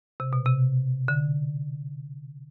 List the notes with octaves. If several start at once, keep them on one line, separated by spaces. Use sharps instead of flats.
C3
B2
C3
D3